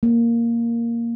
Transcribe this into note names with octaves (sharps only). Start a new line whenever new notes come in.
A#3